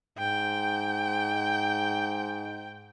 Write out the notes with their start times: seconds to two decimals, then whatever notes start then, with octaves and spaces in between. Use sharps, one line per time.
0.18 G#2 G5